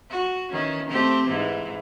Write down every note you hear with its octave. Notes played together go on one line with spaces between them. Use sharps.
F#4
D#3 E3 C#4
A3 C4 G4
G#2 E3